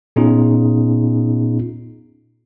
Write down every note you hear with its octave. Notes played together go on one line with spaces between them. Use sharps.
A#2 B3 C#4 D#4 F4 G#4